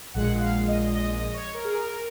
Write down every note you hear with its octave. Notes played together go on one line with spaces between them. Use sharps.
A#1 A#2 G#3 F#5
F5
D#5
D#5
D#5
C#5
A#4
G#4
A#4